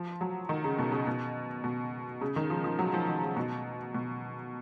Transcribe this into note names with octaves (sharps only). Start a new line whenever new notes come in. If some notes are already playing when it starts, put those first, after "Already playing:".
Already playing: F3
F#3
D#3
C#3
B2
C#3
B2
B2
C#3
D#3
F3
F3
F#3
F3
D#3
C#3
B2
B2